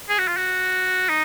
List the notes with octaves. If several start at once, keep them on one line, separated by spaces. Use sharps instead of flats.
G#4
F#4
F4
F#4
D#4